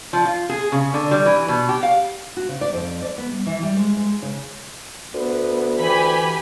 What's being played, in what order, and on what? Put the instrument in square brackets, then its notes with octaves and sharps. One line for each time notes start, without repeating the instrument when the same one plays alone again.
[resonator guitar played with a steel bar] F3
F4
G#4
C#3
D3
G3
E3
B2
G4
F5
[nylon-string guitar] F#4
C#3
D5
F2
D5
B3
G3
E3
G3
G#3
G#3
C#3
[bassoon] D2 [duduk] B3
[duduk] E3 [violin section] G4 G#5 B5